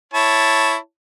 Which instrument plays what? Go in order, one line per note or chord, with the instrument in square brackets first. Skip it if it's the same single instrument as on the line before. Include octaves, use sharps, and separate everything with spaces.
[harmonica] E4 C#5 A5